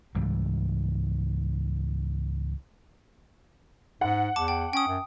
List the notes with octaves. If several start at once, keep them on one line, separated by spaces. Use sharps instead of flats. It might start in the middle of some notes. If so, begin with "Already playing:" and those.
C#2 G#2 E3 G3
G#2 F#5
E2 A5 D6
G5
C#4 G5 D#6
F#2